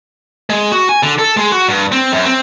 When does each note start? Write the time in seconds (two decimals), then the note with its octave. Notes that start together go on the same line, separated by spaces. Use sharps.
0.50 G#3
0.72 F#4
0.89 G#5
1.03 D3
1.19 A4
1.37 G#3
1.52 F#4
1.68 G2
1.92 C4
2.12 F#2
2.25 C4